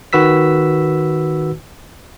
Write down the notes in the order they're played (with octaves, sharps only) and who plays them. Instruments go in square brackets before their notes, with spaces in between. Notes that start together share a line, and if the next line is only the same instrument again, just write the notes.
[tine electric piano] D#3 F#4 B4 E6 B6